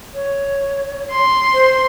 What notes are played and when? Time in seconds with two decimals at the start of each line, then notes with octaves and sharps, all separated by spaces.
0.14 C#5
1.12 C6
1.54 C5